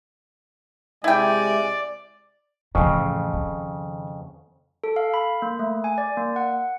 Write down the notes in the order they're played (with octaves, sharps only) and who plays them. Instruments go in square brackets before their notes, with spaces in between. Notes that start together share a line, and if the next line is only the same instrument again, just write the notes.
[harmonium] C3 G#3 G#5 [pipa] E4 G5 [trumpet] D5
[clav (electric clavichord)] F2 C#3 [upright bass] A2 E3
[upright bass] D#3
[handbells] A4
F5
B5
A#3
A3
G#5
D5
A#3
F#5